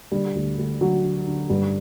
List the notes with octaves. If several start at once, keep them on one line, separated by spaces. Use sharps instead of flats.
D3 G3
D2
D2
D3 F#3
D3
D3
G2 G3